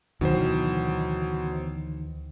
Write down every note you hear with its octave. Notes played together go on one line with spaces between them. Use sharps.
D2 B2 D#3 E3 F#3 C5